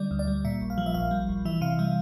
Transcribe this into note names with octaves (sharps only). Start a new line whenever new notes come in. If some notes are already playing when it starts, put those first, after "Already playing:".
Already playing: D3 G3 D5
D2
D5
G3
A#2 E5
A#1
F5
F3
E5
A#1 F5
G3
A#1
E3 E5
C3 F5
G3 E5